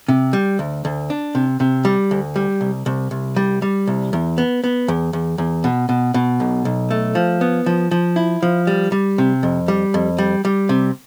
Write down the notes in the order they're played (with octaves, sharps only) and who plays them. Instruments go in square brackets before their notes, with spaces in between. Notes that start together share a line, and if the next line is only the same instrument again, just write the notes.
[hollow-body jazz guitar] C3
G3
D2
D2
D4
C3
C3
G3
D2
G3
C2
C2
C2
G3
G3
C2
E2
B3
B3
E2
E2
E2
B2
B2
B2
B1
B1
A3
F3
B3
F3
F3
E4
F3
G3
G3
C3
F2
G3
F2
G3
G3
C3